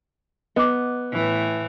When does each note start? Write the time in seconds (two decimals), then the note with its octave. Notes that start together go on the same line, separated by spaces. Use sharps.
0.56 B3 D#5 D6
1.12 A2 E3